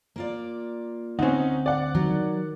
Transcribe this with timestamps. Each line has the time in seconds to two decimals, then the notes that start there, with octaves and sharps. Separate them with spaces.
0.16 A#3 F4 D5
1.19 D2 C4 C#4 D#4 F#5
1.66 D5 F#5
1.95 D#3 F#3